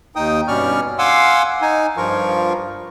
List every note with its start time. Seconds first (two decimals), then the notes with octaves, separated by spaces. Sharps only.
0.16 D#2 D#4 G5 D#6
0.48 G2 B2 C#4 D5 C#6 F6
0.99 F5 F#5 G#5 C6 D6 E6
1.62 D#4 G#5
1.97 G2 F3 F4 A#4 C#6